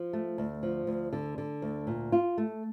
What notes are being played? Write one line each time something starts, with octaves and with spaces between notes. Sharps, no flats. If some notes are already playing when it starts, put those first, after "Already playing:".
Already playing: F3
A3
D2
F3
D2
D3
D3
D2
A#2
F4
A3